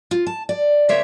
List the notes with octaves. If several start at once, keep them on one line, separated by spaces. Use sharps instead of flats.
F4
A5
D5
C#3 G3 A#3 C5 C#5 E5